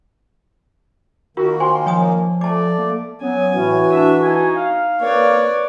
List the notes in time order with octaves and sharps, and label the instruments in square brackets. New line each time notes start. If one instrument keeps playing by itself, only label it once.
[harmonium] D#3 A#3 [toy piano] F4 A#4 [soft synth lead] F#4
[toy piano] C5 G#5 [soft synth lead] C6
[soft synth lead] F3 [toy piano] C#5 G#5 D#6
[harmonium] A3 D5 [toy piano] A5 D6
[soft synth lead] A#3
[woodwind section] F#3 B3 [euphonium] C#4 [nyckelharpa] G#5
[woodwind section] A2 C#4 [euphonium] E3 [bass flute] F#4
[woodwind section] D4 [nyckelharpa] E5
[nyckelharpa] D#4 [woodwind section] G#5
[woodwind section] F5
[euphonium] A#3 [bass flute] B4 [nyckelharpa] C#5 D5